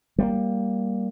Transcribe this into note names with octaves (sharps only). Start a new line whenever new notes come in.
G3 A3 A#3